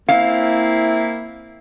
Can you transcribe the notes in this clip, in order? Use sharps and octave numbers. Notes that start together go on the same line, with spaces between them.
A#3 C4 E4 F5